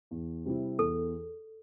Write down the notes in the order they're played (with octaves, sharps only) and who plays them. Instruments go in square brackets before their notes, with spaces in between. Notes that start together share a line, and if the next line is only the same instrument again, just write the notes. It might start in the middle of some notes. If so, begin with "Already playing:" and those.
[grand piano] E2
C3 G3 C4 E4
[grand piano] E2 [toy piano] A4